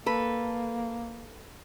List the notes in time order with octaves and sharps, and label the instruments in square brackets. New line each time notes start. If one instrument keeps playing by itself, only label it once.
[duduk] A#3 [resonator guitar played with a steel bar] A4 B4